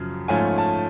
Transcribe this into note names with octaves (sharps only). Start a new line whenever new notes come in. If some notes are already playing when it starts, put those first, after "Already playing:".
Already playing: F#2 C#3 F3
G#2 F3 A3 C#4 F4 G#5
A5